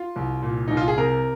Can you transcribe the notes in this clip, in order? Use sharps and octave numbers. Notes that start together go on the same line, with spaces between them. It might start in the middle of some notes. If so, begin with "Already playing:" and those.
Already playing: F4
C2
A#2
C2 D#4
F4
G#4
C3 A#4